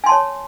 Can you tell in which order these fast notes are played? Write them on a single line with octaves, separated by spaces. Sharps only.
G#5 C6 A5 C#5